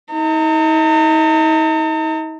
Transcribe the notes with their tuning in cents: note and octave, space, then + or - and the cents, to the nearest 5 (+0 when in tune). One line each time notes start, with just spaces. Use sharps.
D#4 +40 A#5 -45